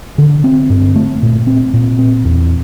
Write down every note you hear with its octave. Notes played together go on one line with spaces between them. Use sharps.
D3
C4
G2
A3
A#2
C4
A#2
C4
E2